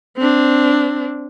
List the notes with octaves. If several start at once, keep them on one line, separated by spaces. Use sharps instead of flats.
C4 D4